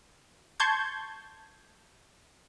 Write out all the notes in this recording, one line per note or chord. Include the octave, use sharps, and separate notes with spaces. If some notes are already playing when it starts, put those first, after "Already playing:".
A5 C6 C#6 G6 G#6